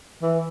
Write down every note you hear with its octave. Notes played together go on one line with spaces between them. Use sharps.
E3